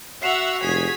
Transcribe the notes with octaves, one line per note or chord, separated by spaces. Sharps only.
F#4 E5 F#5 E6 C7 E7 F7
F1 G#4 G#6 B6